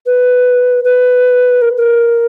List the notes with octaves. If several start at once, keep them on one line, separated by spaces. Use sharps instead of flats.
B4
B4
A#4
A#4